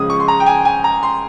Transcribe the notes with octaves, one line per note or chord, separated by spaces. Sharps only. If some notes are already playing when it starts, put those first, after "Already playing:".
Already playing: C#2 C#3 F3 G#3 D#6
C#6
C6
A#5
G5
G#5
G#5
A#5
C6